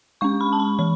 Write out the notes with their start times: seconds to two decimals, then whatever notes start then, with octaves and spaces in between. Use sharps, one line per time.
0.21 G#3 C#4 C#6
0.41 B5
0.53 A5
0.60 B5
0.79 E3 B5